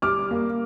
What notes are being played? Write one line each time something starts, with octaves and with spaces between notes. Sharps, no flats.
G3 D6 F6
A#3